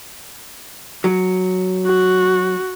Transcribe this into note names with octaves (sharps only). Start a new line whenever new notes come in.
F#3
F#4